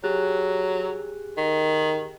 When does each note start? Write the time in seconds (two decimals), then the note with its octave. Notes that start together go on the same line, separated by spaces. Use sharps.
0.04 F#3 G4 G#4 F#6
1.37 D#3